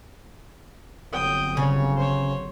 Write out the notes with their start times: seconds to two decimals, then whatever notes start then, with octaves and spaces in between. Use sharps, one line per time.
1.13 G1 F#3 C4 G5 D#6
1.57 C#3 C#5
1.97 C5 C#5